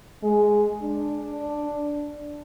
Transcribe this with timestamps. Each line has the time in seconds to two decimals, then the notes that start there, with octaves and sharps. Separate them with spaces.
0.23 G#3
0.83 D4